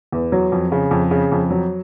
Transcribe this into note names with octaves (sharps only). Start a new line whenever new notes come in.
E2
F#3
F2
C#3
F2
C#3
F2
F#3